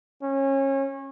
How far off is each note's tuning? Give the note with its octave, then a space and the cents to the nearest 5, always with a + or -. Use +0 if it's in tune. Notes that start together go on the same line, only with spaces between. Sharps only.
C#4 -25